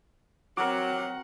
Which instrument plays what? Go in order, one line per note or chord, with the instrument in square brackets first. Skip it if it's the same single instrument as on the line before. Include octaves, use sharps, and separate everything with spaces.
[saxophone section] F#3 [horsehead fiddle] C4 F#5 [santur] F#4 A#4 [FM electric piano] D6